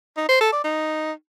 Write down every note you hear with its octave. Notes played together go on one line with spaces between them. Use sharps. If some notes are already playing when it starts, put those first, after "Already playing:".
D#4
C5
A4
D5
D#4